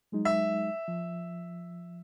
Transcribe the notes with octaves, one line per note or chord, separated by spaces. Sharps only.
F#3 G#3 D#4
E5
F3